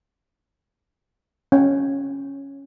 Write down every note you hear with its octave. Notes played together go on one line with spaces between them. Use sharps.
C#4